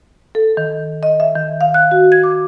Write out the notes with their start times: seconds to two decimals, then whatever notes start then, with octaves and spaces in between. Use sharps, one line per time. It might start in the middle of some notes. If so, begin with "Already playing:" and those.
0.35 A4
0.57 D#3
1.03 D#5
1.20 E5
1.35 D#3
1.61 F5
1.74 F#6
1.91 F#4
2.12 G#6
2.23 D6